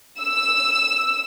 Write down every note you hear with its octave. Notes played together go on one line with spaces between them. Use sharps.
E6